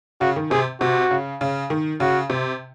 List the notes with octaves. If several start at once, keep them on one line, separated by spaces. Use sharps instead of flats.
C#3 F#4
D#3
C3 G#4
C3 F#4
C#3
C#3
D#3
C#3 F#4
C3